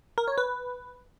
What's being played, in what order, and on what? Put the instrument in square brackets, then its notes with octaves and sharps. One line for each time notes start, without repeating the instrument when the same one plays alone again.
[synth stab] A#4
C#5
B4